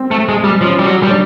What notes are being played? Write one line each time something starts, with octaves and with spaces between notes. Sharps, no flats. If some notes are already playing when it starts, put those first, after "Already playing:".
Already playing: C4
A3
G#3
G3
F3 C#4
G3
F#3
G3
D4